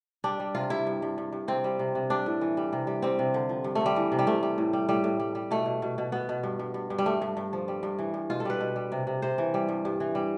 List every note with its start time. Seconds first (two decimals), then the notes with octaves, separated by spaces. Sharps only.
0.24 G3 D4
0.40 G3
0.55 C3 F4
0.70 G3 E4
0.87 G2
1.02 G2
1.18 G2
1.32 G2
1.48 C3 C4
1.64 G3
1.79 C3
1.95 C3
2.10 G3 D4
2.26 A2
2.41 E3
2.57 G3
2.73 C3
2.87 G3
3.02 G3 C4
3.19 C3
3.34 D3
3.49 F3
3.64 G2
3.75 A3
3.81 D3
3.86 G3
3.96 E3
4.12 C3
4.19 G3
4.27 C3 A3
4.43 G3
4.58 A2
4.73 G3
4.89 A2 G3
5.04 A2
5.19 G3
5.35 G3
5.51 B2 A3
5.66 B2
5.82 B2
5.98 B2
6.12 B2 B3
6.29 B2
6.43 G2
6.59 G2
6.74 G2
6.90 G2
6.98 G3
7.06 G2 A3
7.22 G2
7.37 G2
7.53 F3
7.68 G3
7.83 G2
7.99 E3
8.14 G2
8.30 B2 F4
8.40 A4
8.45 G3 B4
8.60 B2
8.76 G3
8.92 C3
9.07 C3
9.22 C3 C5
9.38 E3
9.54 G3
9.68 G2
9.85 G2
10.00 E3
10.15 G3